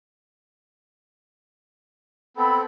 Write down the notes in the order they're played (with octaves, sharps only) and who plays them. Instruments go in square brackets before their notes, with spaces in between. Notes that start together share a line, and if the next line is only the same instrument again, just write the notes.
[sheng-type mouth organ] B3 C4 A4 [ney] B5